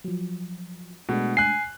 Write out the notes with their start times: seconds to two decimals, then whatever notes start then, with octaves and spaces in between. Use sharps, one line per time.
0.04 F3 F#3
1.09 B2 G#3 A3 D4
1.37 G#5 F#6 C7